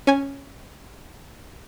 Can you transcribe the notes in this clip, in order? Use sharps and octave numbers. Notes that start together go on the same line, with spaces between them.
C#4 G#5